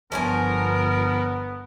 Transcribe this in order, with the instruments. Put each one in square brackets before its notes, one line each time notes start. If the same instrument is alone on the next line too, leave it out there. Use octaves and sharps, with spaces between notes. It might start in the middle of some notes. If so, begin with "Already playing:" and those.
[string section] G1 [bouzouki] F3 C#5 G#5 [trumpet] B3 [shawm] A#4